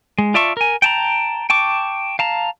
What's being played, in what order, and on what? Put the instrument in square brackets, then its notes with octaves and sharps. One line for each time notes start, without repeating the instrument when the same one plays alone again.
[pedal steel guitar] G#3
F4 D5 E5 A5 C#6
A#4 G#5
G5 A5 A#5
G5 A5 C#6 D6
F5 A5 A#5